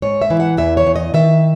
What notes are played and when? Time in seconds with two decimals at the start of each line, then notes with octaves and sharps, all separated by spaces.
0.02 G#2 C#5
0.22 E5
0.30 E3
0.40 F#5
0.57 E2 E5
0.77 C#5
0.87 E2
0.96 D#5
1.14 D#3 E5